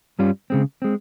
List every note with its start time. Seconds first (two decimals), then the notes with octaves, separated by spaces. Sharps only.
0.19 G2 G3 C#4 F4
0.50 C#3 G#3 C4
0.82 G#3 C4